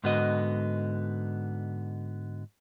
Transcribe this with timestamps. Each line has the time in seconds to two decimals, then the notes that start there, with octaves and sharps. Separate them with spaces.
0.04 G#2 D3 B3 F#4 D#5